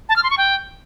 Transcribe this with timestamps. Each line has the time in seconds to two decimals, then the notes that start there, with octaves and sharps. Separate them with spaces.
0.09 A5
0.16 F6
0.23 C6
0.31 C#6
0.38 G5